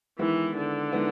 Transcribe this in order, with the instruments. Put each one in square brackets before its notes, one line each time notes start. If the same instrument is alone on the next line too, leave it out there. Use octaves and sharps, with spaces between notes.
[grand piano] D#3 G#3 B3 E4 [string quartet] E3
[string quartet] D3
[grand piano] D#3 G#3 B3 E4